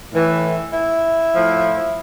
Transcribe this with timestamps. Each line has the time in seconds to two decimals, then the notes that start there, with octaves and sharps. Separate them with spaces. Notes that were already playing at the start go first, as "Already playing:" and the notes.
0.12 A2 E3
0.73 E4
1.33 A2 F3